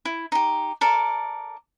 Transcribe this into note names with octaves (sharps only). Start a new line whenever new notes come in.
E4
D#4 G4
A4 A#4 D5